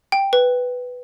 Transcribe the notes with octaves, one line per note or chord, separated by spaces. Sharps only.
G5
B4